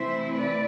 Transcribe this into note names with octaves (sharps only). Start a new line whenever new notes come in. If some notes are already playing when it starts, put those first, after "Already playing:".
Already playing: C3 E3 A3 C4 E4 C5 E5
B4 D5